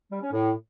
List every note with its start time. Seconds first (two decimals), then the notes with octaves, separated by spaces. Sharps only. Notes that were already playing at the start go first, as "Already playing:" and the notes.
0.11 G3
0.21 C#4
0.31 A2